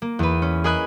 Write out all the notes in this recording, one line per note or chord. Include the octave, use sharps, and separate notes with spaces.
A#3
E2 B4
C#4
G#4 A#4 D#5 B5 F#6 G#6